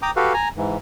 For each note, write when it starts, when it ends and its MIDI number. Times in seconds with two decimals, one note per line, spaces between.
0.02 0.11 79
0.02 0.11 82
0.02 0.11 86
0.02 0.11 87
0.16 0.33 66
0.16 0.33 67
0.16 0.33 69
0.16 0.33 71
0.16 0.33 77
0.34 0.48 80
0.34 0.48 82
0.57 0.77 44
0.57 0.77 52